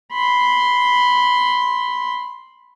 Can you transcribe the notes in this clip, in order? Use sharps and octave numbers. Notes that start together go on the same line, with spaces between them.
B5 C6